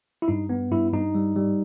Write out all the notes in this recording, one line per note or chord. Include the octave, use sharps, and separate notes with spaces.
E4
G2 D#4
B3
G2 E4
G2 D#4
G3
G3